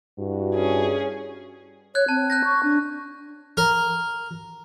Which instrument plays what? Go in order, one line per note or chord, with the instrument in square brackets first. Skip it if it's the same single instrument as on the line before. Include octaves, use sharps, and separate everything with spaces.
[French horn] G2 [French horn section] E4 F#4
[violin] C#4 G#4
[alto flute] C#5 [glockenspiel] F#6 G#6
[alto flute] C4 [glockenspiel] A5
[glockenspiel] F#6 G6 A#6
[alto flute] C#6
D4
[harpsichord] A#4